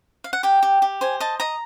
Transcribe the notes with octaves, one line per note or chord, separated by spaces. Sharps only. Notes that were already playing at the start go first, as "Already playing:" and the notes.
F5
F#5
G4 G5
G4
G4
C5 G#5
D#5 A5
D#5 A#5